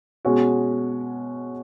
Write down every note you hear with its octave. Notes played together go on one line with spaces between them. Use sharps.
B2 G#3 C#4 F#4